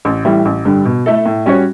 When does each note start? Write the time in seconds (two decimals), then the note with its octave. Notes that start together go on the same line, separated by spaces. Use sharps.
0.05 A1
0.25 A2 E3 G3
0.45 A1
0.65 G2 D3 G3
0.85 B2
1.06 A3 E4 A4
1.25 A2
1.46 G3 C#4 F#4 C#5